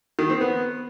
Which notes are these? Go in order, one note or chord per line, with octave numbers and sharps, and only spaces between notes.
D#3
C4
B3